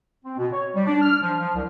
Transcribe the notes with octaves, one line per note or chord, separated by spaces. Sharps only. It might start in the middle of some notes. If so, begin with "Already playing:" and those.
C4
B2
C#5
G3
D4
F6
F3
F3
C2